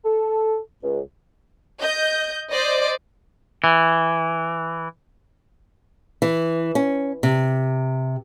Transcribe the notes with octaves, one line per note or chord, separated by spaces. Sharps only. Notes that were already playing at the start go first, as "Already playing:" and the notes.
A4
C#2
D#5 G6
C5 D5 D#5
E3
E3
C#4
C3